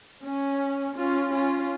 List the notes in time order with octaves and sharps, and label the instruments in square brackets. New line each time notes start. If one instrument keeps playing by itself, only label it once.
[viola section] C#4
C#4 F4
C#4 F4